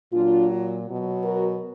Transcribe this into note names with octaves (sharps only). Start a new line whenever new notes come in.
A#2 F#3 D4 F4
B2 F#3
F#4 A#4